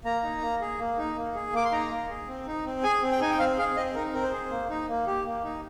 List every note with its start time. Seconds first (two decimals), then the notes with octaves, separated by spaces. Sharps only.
0.05 A#3 A#5
0.23 D#4
0.42 A#3
0.61 G#4
0.79 A#3
0.98 D#4
1.17 A#3
1.35 G#4
1.53 A#3 D6
1.65 C6
1.72 D#4 A#5
1.90 A#3
2.09 G#4
2.27 C4
2.46 D#4
2.66 C4
2.83 G#4 G#5
3.02 C4
3.12 G5
3.21 D#4 G#5
3.30 G5
3.39 C4 F5
3.58 G#4 F5
3.77 C4 D#5
3.95 D#4 A#4
4.13 C4 A#4
4.23 C5
4.32 G#4
4.51 A#3
4.69 D#4
4.88 A#3
5.07 G4
5.26 A#3
5.44 D#4